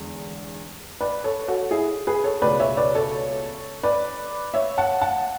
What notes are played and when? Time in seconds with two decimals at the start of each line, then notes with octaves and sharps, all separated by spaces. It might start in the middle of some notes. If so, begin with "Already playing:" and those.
Already playing: E2 D3 G#3
1.01 B4 D5
1.24 A4 C#5
1.48 F#4 A4
1.71 E4 G#4
2.07 G#4 B4
2.24 A4 C#5
2.42 C#2 B2 G#3 B4 D5
2.60 C#5 E5
2.77 B4 D5
2.95 A4 C#5
3.83 B4 D5
4.54 C#5 E5
4.78 F#5 A5
5.01 F#5 A5